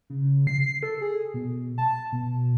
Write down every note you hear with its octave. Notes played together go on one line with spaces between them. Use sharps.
C#3
C7
A4
G#4
B2
A5
B2